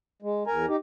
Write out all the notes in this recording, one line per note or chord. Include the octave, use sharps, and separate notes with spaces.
G#3
E2 A#4 G#5 A#5
D#4 G4